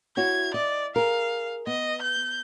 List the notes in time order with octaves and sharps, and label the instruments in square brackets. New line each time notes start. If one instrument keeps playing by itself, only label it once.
[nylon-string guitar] E4 F#4 C#5 [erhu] G#6
[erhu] D5 [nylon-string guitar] D#5
[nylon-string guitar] G#4 A#4 [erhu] F5
[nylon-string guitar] B3 [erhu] D#5
[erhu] G6